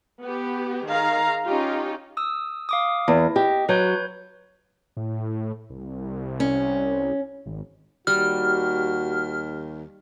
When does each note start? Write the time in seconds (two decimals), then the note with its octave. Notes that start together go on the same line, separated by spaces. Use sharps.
0.22 B3 G4
0.87 D#3 G#4 F5 A#5
1.45 C#4 D#4 F4 G4
2.17 D#6 E6
2.69 F5 D6 D#6
3.08 E2 E4
3.36 G4 D#5
3.69 F#3 B4 C#5 G6
4.97 A2
5.70 C2
6.40 C#4
7.46 G#1
8.07 D#2 G3 F#4 F6